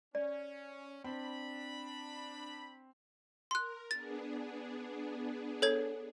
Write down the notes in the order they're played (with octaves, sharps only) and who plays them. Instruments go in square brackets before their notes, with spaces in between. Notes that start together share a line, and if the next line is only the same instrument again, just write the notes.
[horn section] C#4 [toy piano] D5
[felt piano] C4 [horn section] D4 B5
[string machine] A#4 [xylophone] C6 F#6
[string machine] B3 D4 G#4 [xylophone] A6
[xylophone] A4 C#5 G#6